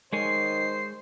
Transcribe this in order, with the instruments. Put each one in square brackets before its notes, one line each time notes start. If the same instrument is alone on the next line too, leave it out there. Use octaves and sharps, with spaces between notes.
[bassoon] D#3 [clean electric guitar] G#3 C#5 G#5 [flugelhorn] C5 [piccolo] C7